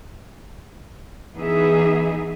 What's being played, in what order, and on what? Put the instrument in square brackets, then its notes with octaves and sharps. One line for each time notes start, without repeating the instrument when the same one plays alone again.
[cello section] E3 B3 D#4 G#4 E5